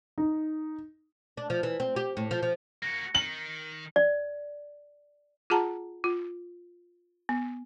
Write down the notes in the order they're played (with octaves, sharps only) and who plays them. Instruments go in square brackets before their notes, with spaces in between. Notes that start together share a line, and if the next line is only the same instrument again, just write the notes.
[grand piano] D#4
[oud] D4
F3
E3
C4
G4
A2
F3
F3
[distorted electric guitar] A#3 F#4 [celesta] A#6 C#7
[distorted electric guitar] D#3 [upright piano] F#7
[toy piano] D5
[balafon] F4 G#4 F#5 A5 A#5
F4
B3